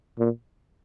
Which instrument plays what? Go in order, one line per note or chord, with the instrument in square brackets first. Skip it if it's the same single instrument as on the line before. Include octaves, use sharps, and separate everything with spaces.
[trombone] A#2